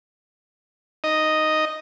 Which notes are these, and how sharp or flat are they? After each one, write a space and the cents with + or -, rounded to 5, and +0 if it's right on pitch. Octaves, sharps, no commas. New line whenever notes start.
D#4 +0 D#5 +0